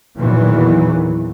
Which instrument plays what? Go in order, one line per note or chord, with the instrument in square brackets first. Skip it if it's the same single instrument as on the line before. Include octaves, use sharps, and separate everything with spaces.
[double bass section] E2 A#2 D#3 E3 F#3